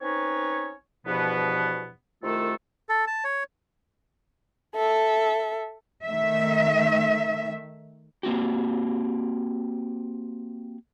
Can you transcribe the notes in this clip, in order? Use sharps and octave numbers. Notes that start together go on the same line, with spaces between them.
C4 C#4 D#4 B4 C#5
E2 G2 B2 F3 B3
C2 D#3 A3 F4 A4
A4
A5
C#5
A4 E5
D#3 A3 E5
A#3 C4 F#4 G4